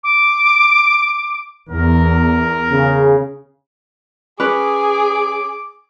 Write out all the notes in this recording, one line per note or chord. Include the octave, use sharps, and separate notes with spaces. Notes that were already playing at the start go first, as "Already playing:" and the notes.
D6
E2 A#4
C#3
C#4 G#4 B4 D6